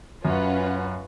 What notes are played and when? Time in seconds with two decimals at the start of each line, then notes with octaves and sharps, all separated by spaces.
0.24 F#2 C#4 F4 B4 F#5